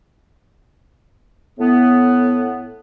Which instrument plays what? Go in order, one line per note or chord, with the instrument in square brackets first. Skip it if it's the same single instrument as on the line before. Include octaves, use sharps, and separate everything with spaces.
[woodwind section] A2 B3